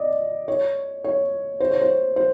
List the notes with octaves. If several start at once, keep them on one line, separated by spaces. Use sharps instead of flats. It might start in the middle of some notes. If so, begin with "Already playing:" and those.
Already playing: D5 D#5
C#5
C#5
C5
C#5
C5
C5